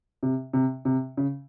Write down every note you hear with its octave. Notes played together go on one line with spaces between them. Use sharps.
C3
C3
C3
C#3